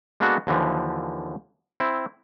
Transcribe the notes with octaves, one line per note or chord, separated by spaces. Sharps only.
G#3 A#3 B3 D4 F#4 A4
D#2 D3 E3 F3
C4 E4